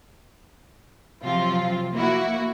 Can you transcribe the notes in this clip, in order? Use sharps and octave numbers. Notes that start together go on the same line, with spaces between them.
C3 F3 F#3 C4 F4
A#3 E4 F#4